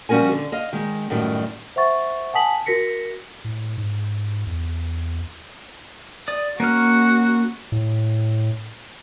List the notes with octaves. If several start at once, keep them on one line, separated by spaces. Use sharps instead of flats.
F3 G3 C#4 F#4 A#4 G#5
D3
D#5 F5
D#3 G#3
F#2 A2 D#3 F#3 G3
C5 E5 F#5 C#6 A6
F#5 G#5 A5 D#6 B6 F#7
F#4 A#4 A#6 B6 C#7
A2
G#2
E2
D5 D#6
A#3 C#4 F#4 F6
A2